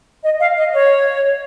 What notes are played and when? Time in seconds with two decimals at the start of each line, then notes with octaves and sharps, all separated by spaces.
0.23 D#5
0.39 F5
0.56 D#5
0.73 C#5